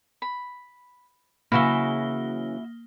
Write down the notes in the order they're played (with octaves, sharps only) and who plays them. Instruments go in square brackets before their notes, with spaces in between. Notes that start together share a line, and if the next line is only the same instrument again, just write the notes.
[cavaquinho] B5
[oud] C#3 E3 F#3 [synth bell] A#3 G7 [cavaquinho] E4 F#4 E5